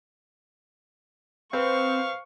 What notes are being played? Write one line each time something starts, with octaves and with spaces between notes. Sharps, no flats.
C4 B4 C5 F5 C#6